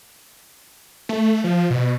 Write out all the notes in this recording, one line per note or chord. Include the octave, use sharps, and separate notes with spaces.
A3
F3
B2